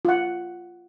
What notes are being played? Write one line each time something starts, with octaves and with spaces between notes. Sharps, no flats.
F4 F#5